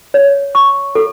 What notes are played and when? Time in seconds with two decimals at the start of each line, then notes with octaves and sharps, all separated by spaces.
0.14 C#5
0.55 C#6
0.95 A4